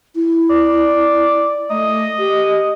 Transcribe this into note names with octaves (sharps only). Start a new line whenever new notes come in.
E4
D5
A3 D#5
G4